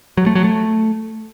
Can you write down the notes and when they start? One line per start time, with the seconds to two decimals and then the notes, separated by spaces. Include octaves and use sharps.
0.17 F#3
0.26 A3
0.35 F#3
0.44 A3